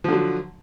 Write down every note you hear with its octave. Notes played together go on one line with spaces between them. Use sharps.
D3 F3 F#3